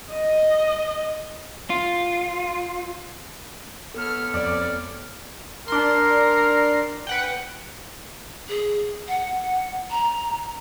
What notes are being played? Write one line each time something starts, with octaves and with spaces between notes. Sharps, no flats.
D#5
F4
B3 A4 C#5 F6
F2 D5
D4 A#4 C6
B4 F#5 G5
G#4
F#5
A#5